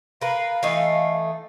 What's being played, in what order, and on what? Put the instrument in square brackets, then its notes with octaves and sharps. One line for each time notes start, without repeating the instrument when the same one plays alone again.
[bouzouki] A#4 B4 [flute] F5
[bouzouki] E3 A3 D#4